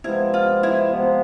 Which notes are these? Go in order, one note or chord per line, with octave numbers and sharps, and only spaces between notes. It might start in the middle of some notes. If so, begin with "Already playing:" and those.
C3 F3 G#3 B3 E4
F4
E4
C3 F3 G#3 B3